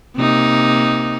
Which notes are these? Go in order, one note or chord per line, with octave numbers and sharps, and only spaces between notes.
C3 A#3 D#4